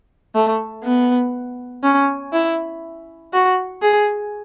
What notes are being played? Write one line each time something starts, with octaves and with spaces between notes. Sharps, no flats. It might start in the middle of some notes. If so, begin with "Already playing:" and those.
A3
B3
C#4
E4
F#4
G#4